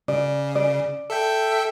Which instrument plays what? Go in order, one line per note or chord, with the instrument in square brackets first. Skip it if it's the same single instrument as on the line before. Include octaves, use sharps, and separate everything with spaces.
[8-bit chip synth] C#3 [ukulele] D5
[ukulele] D5
[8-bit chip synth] A4 E5 G5